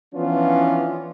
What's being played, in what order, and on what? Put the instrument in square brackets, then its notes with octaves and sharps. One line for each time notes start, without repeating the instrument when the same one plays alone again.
[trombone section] E3 F3 B3 C#4 D4 F4